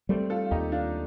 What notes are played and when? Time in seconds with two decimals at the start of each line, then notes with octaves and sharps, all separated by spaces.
0.09 G3 A3 C4
0.30 F4 A4
0.46 F4
0.51 D#2 D#4 G4
0.72 D4 F4